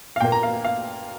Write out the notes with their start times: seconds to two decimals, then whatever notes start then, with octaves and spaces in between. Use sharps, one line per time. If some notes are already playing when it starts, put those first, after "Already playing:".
0.16 F5
0.21 A#2 A#3 G5
0.32 A#5
0.43 F5
0.64 F5